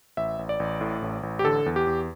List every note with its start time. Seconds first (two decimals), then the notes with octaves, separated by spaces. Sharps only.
0.17 A1 E5
0.39 A1
0.49 D5
0.60 A1
0.81 A2
1.02 A1
1.23 A1
1.39 G4
1.44 D3 A4
1.66 E2
1.76 G4
1.87 E2